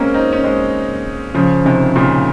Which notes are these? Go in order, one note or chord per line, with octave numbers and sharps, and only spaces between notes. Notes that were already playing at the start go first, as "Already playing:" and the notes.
Already playing: G#3 A#3 C4 C#4
C4 D#4
C#4
G#3 C4
C#3 F3
C3 D#3
A#2 C#3